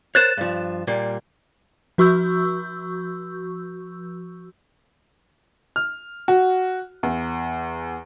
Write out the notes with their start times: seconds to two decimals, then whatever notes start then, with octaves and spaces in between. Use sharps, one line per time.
0.15 A#4 C5 C#5 F#6 A6 E7
0.37 G2 F3
0.87 A#2 G3 A#3
1.98 F3 F#4 C#6 E6 G6
5.76 F6
6.28 F#4
7.03 E2